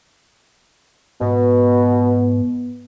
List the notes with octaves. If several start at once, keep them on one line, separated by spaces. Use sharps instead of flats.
G#2 B2 B3